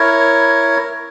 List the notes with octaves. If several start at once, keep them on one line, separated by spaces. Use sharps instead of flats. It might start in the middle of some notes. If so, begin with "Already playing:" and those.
Already playing: E4 A#4 C#5